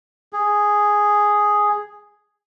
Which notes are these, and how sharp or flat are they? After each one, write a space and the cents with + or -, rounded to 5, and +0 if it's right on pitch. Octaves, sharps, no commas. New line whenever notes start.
G#4 +0